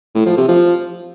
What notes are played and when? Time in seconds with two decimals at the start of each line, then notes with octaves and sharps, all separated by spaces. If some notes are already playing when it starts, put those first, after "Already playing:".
0.15 A2
0.26 F3
0.37 C3
0.49 F3